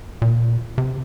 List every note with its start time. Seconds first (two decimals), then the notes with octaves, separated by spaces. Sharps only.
0.22 A#2
0.78 C3